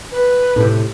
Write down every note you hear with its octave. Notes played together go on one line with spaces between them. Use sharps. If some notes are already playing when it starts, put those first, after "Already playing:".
B4
A2 C3